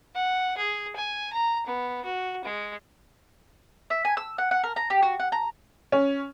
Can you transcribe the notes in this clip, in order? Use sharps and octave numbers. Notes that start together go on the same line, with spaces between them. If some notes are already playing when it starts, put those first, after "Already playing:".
F#5
G#4
G#5
A#5
B3
F#4
G#3
E5
G#5
E6
F#5
F#5
A#4
A#5
G4
F#4
F#5
A#5
C#4